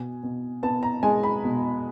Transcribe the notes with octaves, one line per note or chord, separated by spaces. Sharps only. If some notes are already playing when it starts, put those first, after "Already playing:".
Already playing: B2 G#5
B2
B3 A5
A#5
G#3 G#5
B5
B2